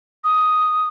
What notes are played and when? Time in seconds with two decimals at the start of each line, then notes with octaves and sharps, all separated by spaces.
0.24 D#6